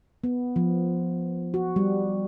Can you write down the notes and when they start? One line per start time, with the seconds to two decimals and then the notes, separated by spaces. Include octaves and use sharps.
0.24 B3
0.56 F3
1.54 F#4
1.76 G3